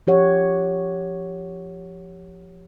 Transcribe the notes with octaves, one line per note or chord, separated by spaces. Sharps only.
F3 G4 C#5 F#5